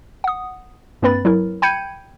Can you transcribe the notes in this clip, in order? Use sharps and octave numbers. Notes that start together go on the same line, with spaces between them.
F#5 D#6
G2 A#3 C4 B4 B5 A6
F#3 E4 A#4
G5 B5 G6 G#6 C#7 D#7